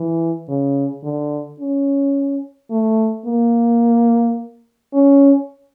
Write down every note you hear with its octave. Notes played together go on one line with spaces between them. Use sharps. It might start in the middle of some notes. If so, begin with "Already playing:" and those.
Already playing: E3
C#3
D3
C#4
A3
A#3
C#4